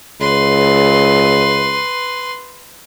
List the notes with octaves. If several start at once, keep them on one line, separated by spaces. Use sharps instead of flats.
C#2 B4 C6